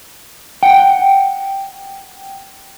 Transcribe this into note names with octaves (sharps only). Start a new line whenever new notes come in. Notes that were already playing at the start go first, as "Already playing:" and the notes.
F#5 G5